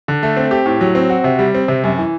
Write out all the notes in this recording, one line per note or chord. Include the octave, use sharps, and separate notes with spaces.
D3
A3
C4
G4
A2
F#3
C4
F#4
C3
G3
C4
C3
F#2
E3